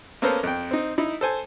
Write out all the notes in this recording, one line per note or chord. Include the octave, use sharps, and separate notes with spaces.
A#3 B3 C#4 A4 A#4 C5
F2 G5
C4 D#4
D#4 E4
A4 C5 G#5